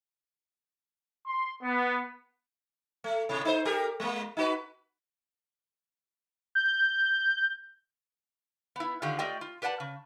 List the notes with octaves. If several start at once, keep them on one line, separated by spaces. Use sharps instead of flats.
C6
B3
A3
A2 C3
D#4 C5
G4 A4 A#4
G#3 A#3
D#4 F#4 B4
G6
B3 E4
D3 D#3 F4 G4
A3 F4 G4 D5 D#5 G5
F4
G4 B4 D5 F#5 A5
C#3